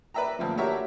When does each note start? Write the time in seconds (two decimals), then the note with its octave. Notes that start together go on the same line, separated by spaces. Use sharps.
0.14 B4 D5 E5 G5 A#5
0.39 D2 A#2 F3
0.57 D4 F#4 G4 A#4 C#5 E5